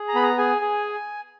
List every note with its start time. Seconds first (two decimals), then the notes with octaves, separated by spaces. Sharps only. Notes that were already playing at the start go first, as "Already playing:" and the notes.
Already playing: G#4
0.08 A#5
0.15 B3 B5
0.23 A#5
0.38 G#4 G#5
0.61 G#4